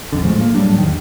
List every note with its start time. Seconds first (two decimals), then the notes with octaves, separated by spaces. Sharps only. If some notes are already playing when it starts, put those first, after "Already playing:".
0.12 A#1 F2 D3
0.24 A2 F3 G#3 A3
0.41 A#3
0.54 A2 F#3 G3 D4
0.78 E2 D#3